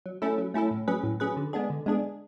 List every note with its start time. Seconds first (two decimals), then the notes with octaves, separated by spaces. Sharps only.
0.06 F#3
0.22 A3 C#4 E4 A4
0.38 F#3
0.54 A3 C#4 E4 A4
0.71 A2
0.88 F#3 C#4 G#4 B4
1.04 A2
1.20 F#3 C#4 G#4 B4
1.37 D3
1.53 G#3 B3 D4 G#4
1.70 D3
1.86 G#3 B3 D4 G#4